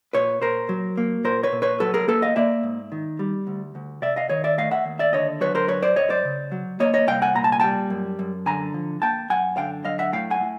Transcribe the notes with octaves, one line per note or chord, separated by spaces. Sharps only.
A#2 B4 C#5
A#2 A#4 C5
F#3
A#3
A#2 A#4 C5
B4 C#5
A#2
B4 C#5
F#3 A4 B4
G#4 A#4
A#3 A4 B4
D#5 F5
A#3 D5 E5
G#2
D#3
G3
D2
D2
C3 D5 E5
D#5 F5
D#3 C#5 D#5
D5 E5
A3 D#5 F5
E5 F#5
D#2
D5 E5
D3 C#5 D#5
F#3 B4 C#5
A#4 C5
F#2 B4 C#5
C5 D5
F#2 C#5 D#5
C5 D5
C#3
F#3
A#3 C#5 D#5
C#5 D#5
C2 F5 G5
F#5 G#5
A#2 A#5
A5
G#5
G3 G5 A5
F#2
F#2
D3 G#5 A#5
F3
A#3 G5 A5
F#2 F#5 G#5
D3 F5 G5
F#3 D#5 F5
E5 F#5
A2 F5 G5
F#5 G#5
A2